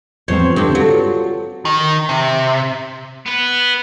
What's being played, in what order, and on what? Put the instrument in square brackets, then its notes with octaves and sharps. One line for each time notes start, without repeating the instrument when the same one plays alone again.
[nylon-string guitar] E2 F3 C4 [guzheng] C5 C#5
[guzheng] G2 C4 [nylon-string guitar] D3
[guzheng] F#3 [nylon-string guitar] F4 A4
[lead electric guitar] D#3
C3
[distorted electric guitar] B3 B4